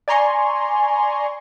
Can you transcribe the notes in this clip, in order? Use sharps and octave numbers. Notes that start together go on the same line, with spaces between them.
D5 G#5 A#5 C6 C#6